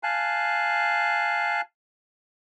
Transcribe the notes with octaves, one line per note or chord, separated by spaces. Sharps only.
F5 G#5 A5 F#6